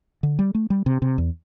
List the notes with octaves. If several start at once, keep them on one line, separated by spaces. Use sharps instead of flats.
D3
G3
A3
G3
C3
C3
E2